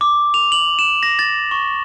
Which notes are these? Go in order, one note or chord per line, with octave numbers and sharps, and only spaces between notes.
D6
F7
F#7
E7
A#6
A6
C#6